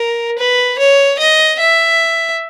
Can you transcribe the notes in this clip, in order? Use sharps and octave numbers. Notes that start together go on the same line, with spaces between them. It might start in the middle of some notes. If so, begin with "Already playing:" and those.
Already playing: A#4
B4
C#5
D#5
E5